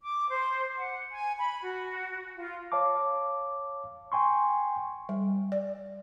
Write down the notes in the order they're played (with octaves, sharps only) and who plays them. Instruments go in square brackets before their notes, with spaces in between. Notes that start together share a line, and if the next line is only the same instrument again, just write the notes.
[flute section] D6
C5
F#5
G#5
B5
F#4
F4
[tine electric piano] C#5 F5 A5 D6
G5 G#5 C6 C#6
[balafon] G3
D5